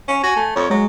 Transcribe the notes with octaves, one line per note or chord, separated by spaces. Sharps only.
C#4
F#4 G#5
A3
F2 C#5
F#3 G#3